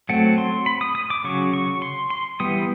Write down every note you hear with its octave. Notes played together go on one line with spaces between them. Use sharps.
F#3 A3 C4 F#5
C6
B5
D#6
D#6
D6
C#3 F#3 C#6
C#6
C6
C6
E3 G3 B3 D#6